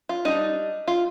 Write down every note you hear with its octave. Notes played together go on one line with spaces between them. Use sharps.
F4
G3 D4 D#4
F4